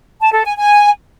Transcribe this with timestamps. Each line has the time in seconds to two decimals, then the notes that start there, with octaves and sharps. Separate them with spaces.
0.21 A5
0.32 A4
0.44 G#5
0.56 G#5